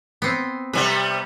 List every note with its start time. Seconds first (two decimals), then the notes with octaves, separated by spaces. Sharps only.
0.22 B3 C4
0.73 C3 G3 B3 B4